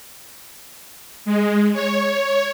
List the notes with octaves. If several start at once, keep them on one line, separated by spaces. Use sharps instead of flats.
G#3
C#5